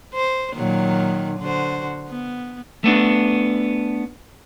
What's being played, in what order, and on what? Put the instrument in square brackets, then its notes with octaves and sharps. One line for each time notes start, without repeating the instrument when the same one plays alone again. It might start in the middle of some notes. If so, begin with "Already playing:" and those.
[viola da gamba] C5
A#2 D#3 F#3
D3 F#4 C5
B3
[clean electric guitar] A3 B3 D4